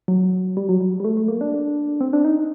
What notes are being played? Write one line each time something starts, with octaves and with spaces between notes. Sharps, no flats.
F#3
G3
F#3
F#3
G3
A3
A3
A#3
D4
C4
D4
D#4